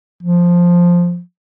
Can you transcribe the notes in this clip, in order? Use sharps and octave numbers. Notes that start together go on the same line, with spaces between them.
F3